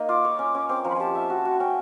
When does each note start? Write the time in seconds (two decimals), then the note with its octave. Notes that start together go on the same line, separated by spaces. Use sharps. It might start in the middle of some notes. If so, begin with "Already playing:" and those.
Already playing: A#3 D#4 D#5
0.09 F4 D6
0.24 C#5
0.39 C#4
0.55 C#4
0.69 C4 D6
0.84 F3 A#5
0.90 B5
0.95 G#5
1.00 G4 A5
1.15 E5
1.30 F#4
1.45 F#4
1.60 C#4 G5